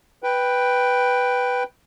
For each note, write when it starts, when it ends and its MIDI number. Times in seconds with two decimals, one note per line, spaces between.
0.23 1.63 71
0.23 1.63 79